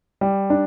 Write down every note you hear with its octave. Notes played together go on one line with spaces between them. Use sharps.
G3
D4